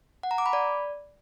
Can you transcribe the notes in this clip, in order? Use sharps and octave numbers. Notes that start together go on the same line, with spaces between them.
F#5
A#5
D6
B5
D5